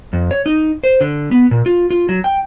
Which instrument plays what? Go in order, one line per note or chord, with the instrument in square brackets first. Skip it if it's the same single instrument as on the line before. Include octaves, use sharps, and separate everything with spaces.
[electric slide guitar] F2
C#5
D#4
C5
D3
B3
A#2
F4
F4
F#3
G5